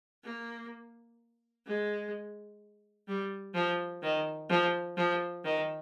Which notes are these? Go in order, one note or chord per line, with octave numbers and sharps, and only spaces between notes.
A#3
G#3
G3
F3
D#3
F3
F3
D#3